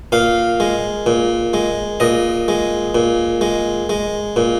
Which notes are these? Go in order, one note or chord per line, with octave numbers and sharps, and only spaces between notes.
A#2 F5
G#3
A#2
G#3
A#2 D#5
G#3
A#2
G#3
G#3
A#2